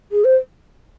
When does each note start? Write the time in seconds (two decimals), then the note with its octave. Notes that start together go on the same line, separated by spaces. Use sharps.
0.12 G#4
0.25 C5